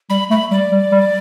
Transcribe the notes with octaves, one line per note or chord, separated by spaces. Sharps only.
G3 B5
A3 B5
G3 D5
G3
G3